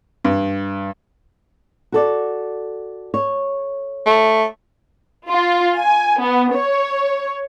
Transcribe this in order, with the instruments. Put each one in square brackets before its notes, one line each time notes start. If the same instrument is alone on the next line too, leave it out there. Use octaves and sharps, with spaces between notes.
[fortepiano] G2
[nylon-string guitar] F#4 A4 D5
C#5
[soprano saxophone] A3
[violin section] F4
G#5
B3
C#5